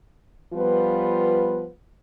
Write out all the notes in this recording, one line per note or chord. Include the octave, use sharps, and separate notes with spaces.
F3 G3 B3 F4 B4